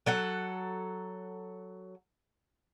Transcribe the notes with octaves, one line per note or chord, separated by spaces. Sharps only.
F#3 A4 F#5